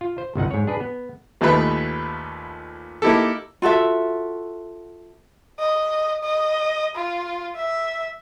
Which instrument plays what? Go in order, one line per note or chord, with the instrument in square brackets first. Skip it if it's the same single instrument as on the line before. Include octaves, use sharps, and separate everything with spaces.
[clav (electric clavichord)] F4
C5
G1 C2 D#4 F#5
G#2 C#5
D4 G#4 B4
B3
[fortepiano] A#1 D#2 A3 D#4 B4 B5
A#3 D#4 E4 G4 A4
[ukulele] F4 F#4 A4 E5
[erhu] D#5
D#5
F4
E5